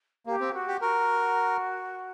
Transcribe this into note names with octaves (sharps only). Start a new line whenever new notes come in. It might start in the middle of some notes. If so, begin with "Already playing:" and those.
A#3 G4
C4
F#4
G4
F#4 A#4